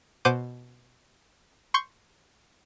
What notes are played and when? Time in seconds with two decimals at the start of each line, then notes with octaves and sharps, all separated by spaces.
0.25 B2 C5 F#5 D6 G6 D#7
1.74 C6 C#6 G6